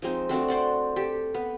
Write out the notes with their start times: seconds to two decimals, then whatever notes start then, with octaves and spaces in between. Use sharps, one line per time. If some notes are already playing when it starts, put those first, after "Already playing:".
0.02 F3 G#3 C4 D#4
0.29 A3 C4 D4 F#4
0.48 C5 D5 F#5
0.96 G4 A4
1.34 B3